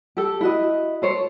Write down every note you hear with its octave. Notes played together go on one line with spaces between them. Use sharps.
G4 A4
E4 F#4 D#5
A4 C5 C#5